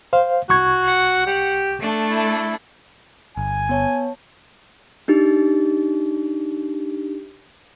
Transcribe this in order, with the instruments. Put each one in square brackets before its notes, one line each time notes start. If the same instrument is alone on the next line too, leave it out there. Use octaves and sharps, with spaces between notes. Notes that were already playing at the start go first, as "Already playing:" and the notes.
[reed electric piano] C5 F5
[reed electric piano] C2 C#6 G#6 [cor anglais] F#4
[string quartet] F#5
[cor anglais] G4
[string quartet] A3 D4 A4
[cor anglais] E4
[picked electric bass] G1 [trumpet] G#5
[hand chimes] B3 C#5 A5
D4 D#4 G4